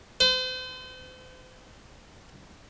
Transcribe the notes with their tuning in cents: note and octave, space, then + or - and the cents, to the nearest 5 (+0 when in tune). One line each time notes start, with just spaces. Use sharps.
C5 -40